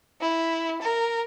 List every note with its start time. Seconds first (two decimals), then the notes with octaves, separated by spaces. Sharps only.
0.20 E4
0.81 A#4